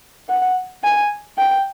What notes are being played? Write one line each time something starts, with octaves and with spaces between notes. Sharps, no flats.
F#5
G#5
G5